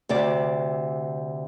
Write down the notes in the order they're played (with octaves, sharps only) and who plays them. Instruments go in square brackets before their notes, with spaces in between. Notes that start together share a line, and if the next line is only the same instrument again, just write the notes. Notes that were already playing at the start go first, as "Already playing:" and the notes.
[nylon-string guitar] D2 C3 D5